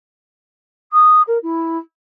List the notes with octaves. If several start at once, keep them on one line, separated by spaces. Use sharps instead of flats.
D#6
A#4
E4